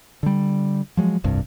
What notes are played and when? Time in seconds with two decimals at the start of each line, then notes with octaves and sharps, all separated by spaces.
0.23 D3 G3
0.97 F3 F#3 G#3
1.24 F1 C2 G2 C3